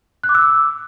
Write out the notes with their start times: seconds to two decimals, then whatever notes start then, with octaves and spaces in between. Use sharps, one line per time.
0.24 F#6
0.29 D6
0.35 E6